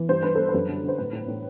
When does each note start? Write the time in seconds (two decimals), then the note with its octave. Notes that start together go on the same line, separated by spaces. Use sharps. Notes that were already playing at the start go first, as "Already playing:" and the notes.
Already playing: E3
0.09 G2 C5
0.23 G2 B4
0.35 G2 A4
0.49 B4
0.54 F#2
0.68 D3
0.83 D3 C5
0.98 A2 B4
1.13 A2
1.28 A2